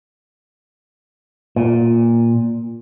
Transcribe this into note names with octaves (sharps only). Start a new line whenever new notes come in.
A#2